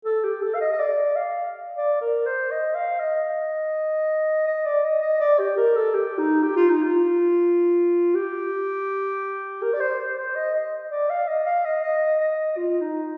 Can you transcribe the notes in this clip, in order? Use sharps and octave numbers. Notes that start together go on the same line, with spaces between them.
A4
G4
A4
F5
D#5
D#5
D5
F5
D5
A#4
C5
D#5
F5
D#5
D#5
D5
D#5
D#5
D5
G4
A#4
A4
G4
D#4
G4
F4
D#4
F4
G4
A#4
D5
C5
C5
C5
D#5
D#5
D5
F5
D#5
F5
D#5
D#5
D#5
F4
D#4